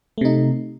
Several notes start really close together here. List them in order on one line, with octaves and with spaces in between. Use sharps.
A3 C3 D#4